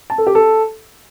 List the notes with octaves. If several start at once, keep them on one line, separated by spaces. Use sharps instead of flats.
A5
A4
G4
A4